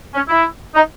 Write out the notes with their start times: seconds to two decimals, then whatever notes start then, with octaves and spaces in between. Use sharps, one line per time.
0.14 C#4
0.29 E4
0.75 D#4